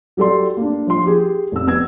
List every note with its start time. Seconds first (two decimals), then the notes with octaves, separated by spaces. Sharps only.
0.17 F#3 G4 A4 D5 C6
0.57 A#3 D4
0.87 F3 C6
1.05 G4 G#4
1.52 F1 E6
1.67 B3 E6 G#6